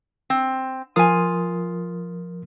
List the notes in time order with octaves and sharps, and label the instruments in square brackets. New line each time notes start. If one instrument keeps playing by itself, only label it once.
[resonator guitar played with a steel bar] C4
[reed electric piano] F3 A#4 D#6 [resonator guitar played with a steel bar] F4 G#5